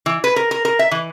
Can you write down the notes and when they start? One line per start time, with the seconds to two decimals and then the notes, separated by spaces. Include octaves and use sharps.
0.06 E3
0.24 B4
0.36 A#4
0.51 A#4
0.65 A#4
0.79 E5
0.91 E3